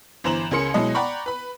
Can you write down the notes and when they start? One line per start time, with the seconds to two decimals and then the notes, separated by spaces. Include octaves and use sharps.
0.24 G1 E3 C5 A#5 E7 F#7
0.51 C#2 C#4 G#4 A#4 C6 C#7
0.74 B2 F#3 G#3 E4 D#5
0.94 D5 F#5 G5 A#5 B5 C#6
1.26 B4 B5